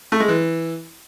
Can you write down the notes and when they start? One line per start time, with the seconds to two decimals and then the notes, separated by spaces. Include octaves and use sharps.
0.12 A3
0.20 G#3
0.28 E3